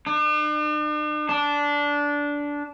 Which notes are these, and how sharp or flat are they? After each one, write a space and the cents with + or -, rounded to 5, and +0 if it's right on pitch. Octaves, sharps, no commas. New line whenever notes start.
D4 +45
D4 -15